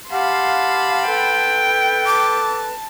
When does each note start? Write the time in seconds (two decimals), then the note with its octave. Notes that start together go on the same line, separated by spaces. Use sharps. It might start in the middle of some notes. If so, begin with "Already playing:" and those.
0.11 G4 F5 F#5 A5 B5 C6
1.07 A4 B4 G5
2.06 A5 D6